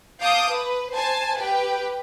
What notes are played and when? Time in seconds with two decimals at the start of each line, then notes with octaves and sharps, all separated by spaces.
0.20 F5 A5 D6 D#6 G6
0.51 B4
0.93 C5 G#5 A5
1.38 G4 B4 G5